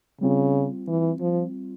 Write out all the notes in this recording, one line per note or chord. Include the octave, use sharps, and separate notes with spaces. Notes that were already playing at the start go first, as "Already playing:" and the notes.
C#3 G3 C4 F4
E3
F3